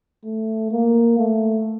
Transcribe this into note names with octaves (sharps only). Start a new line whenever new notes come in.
A3
A#3
A3